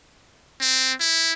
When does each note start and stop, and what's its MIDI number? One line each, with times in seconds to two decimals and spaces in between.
0.61 0.93 60
1.00 1.33 64